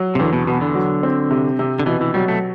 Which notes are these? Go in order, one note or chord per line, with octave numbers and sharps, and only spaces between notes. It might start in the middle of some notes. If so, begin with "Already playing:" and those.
Already playing: F#3
C3
E2 D3
B2
B2 B3
D3
F#3
C4
C3
C3
D3
B2 E3
E3
F#3 G3
A3